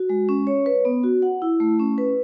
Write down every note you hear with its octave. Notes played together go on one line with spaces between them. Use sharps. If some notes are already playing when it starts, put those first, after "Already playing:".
Already playing: F#4
G#3
C#4
C#5
B4
B3
F#4
F#5
E4
A3
C#4
B4